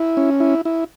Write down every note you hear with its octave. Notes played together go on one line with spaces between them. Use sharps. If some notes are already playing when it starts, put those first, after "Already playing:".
Already playing: E4
C#4
E4
E4